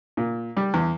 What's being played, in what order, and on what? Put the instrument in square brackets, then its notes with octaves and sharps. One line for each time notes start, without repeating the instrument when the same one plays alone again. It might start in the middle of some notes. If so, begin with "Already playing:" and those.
[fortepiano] A#2
G3
E2